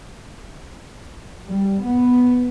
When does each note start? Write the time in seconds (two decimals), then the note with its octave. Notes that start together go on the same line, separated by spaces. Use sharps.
1.48 G3
1.86 B3